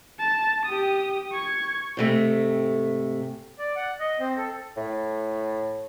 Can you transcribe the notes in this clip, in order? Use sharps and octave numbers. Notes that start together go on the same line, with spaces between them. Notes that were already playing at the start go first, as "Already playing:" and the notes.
A5
G4 D#6
C#6 G#6
G#2 C3 A3
D5
F#5
D#5
C4
A4
A2